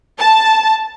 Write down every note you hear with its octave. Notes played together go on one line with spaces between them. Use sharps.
A5